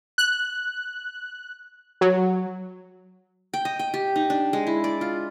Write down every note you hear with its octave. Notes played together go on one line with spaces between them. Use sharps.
F#6
F#3
G5
D#5
G5
G4
D#4
D4
G#3
E4
D5
F4